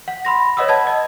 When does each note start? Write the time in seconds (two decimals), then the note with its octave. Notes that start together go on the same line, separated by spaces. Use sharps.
0.08 F#5
0.25 B5 C6 A#6
0.57 B4 C#5 D#5 F#5 D#6 E6
0.68 F#5 A5 B5 G#6
0.87 D#5